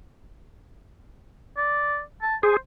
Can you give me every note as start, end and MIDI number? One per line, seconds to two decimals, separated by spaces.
1.57 2.01 74
2.22 2.35 81
2.43 2.57 68
2.43 2.57 72